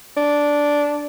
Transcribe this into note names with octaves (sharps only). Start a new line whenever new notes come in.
D4